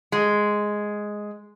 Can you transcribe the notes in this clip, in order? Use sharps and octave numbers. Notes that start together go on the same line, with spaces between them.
G#3